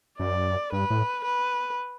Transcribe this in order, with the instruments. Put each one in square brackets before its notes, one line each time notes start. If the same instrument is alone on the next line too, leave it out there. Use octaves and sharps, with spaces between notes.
[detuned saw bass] F#2 [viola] D5
[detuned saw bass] G2 [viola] B4
[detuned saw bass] A2
[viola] B4